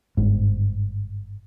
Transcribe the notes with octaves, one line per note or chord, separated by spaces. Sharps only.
G1 G#2